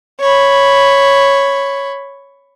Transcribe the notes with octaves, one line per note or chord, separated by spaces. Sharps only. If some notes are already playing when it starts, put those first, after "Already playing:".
C#5 B5